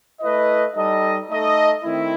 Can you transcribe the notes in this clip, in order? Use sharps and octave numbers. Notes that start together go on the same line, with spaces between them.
A3 E4 B4 D#5
G3 D#4 A4 D#5
A3 D#4 A4 D#5
D#3 A3 C4 E4